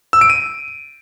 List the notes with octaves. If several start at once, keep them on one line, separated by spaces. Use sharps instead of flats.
E6
D7
D#7